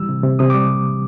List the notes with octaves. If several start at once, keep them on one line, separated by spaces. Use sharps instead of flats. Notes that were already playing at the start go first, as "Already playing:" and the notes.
Already playing: E3 G3 E6
C3
C3
C3 D#6
D6
G3